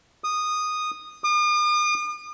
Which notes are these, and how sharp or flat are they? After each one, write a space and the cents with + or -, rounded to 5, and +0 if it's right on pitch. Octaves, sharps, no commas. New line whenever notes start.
D#6 -10
D#6 -45